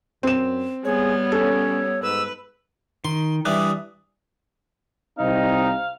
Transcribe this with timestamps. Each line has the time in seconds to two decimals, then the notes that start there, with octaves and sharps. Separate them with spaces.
0.23 F#2 C4 E7
0.85 G3 B3 G#4 C#5
1.32 C#4 A4
2.03 G#2 B4 E6
3.05 D#3 C6
3.45 E3 G3 D4 E5 D#6 F#6
5.18 C2 C4 D#4 F5